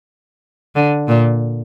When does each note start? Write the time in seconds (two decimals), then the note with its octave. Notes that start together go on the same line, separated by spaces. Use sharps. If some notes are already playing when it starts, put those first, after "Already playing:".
0.76 D3
1.08 A#2